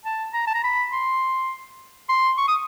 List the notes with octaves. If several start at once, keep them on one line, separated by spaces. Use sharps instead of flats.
A5
A#5
A5
A#5
B5
C6
C6
C#6
D#6